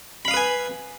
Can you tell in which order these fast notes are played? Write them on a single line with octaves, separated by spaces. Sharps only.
B5 F5 D#6 B4 G#5